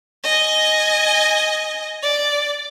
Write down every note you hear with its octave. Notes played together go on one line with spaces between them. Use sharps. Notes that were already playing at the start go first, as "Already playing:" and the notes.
D#5 G#5
D5